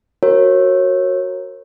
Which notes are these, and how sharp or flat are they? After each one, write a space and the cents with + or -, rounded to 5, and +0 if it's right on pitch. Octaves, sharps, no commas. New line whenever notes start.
F#4 +0 A#4 +0 C#5 -30